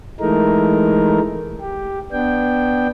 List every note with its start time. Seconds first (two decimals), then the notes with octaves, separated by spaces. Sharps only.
0.20 E3 G#3 A3 D#4 A#4
1.61 G4
2.12 B3 D4 G5